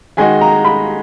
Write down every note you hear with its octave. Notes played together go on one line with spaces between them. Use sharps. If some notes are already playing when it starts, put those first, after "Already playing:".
D#3 G#3 D#4 F#4 G#5
A#5
B5